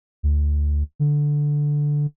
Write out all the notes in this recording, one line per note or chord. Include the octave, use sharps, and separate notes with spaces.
D2
D3